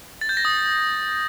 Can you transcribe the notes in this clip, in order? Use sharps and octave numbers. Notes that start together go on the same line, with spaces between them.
A6
G6
A#6
D#6